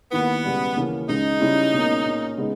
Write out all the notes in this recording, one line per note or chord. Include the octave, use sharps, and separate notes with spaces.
D#2 D#3 A#3 B3 E4
C#2 B2 G3
D#2 C#3 E3 A#3 C#4
C#2 C#3 G#3 D#4
C#3 G3 C#4 E4
C#2 B2 A#3 C#4
A#2 A#3 C#4
C#3 G#3 B3 D#4